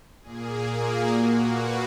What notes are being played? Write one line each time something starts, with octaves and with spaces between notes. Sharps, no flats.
A#2 A#3 G#4
G#4
A#2 A#3 F#4
B4